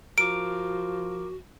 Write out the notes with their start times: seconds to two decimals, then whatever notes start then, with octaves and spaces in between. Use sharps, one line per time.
0.18 F3 F#4 A#4 D6 D7